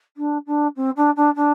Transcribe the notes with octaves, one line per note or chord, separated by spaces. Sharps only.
D4
D4
C4
D4
D4
D4